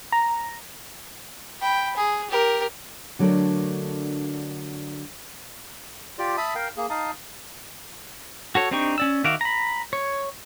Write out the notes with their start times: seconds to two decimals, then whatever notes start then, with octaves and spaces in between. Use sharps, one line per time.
0.12 A#5
1.61 G5 B5
1.97 G#4
2.30 G4 A#4
3.19 D3 F#3 A3 D4 A#4
6.18 F4 G4 D5
6.37 E5 A5 B5 D#6
6.55 A#4 F5 G5
6.77 A#3 G#4
6.90 D#4 F5 A5 D#6
8.55 F#4 A4 C#5
8.71 C4 D4 D#4 G4 C#6
8.98 C#4 D5 E6
9.24 D#3 F#4 E5 F5 D6
9.41 A#5 B5
9.93 C#5